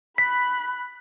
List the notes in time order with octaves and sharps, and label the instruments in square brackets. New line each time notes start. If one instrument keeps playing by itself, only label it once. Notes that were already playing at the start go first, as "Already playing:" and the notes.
[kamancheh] B5 F#6 [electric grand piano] B6